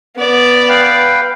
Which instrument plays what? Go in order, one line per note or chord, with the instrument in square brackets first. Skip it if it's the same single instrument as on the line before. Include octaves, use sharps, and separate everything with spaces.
[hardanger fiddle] B3 D5
[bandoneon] B4 F5 G5